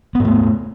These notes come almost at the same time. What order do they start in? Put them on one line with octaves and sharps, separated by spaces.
B3 G#2 A3